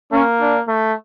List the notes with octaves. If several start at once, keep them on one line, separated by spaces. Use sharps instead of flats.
A#3 C#4
D4
A3